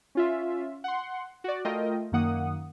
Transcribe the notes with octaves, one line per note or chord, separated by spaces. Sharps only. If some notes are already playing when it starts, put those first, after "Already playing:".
C#4 F4 E5
F#5 C6
F#4 D5
A3 F4 A#4 D#5 G5
F#2 D#3 A#3 F#5 D#6